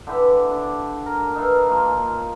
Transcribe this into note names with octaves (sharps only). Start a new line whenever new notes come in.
D3 E3 G4 B4
D4
A#4
D#4 A4 B4 F5
F3 A#3 F4
F4